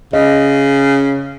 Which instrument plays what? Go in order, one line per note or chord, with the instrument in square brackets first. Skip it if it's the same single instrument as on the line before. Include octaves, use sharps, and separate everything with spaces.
[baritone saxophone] C#3 [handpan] D#5